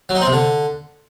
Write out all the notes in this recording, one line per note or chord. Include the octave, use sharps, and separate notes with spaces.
F#3
D#4
C4
C3
D3